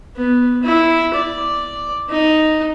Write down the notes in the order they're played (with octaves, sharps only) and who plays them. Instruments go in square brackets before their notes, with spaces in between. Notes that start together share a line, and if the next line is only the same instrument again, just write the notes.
[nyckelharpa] B3
E4
D5
D#4